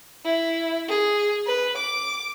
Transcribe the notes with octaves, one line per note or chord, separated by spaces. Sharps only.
E4
G#4
B4
D6